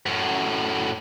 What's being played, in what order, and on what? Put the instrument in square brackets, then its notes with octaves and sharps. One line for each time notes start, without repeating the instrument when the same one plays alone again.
[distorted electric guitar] F#2 A2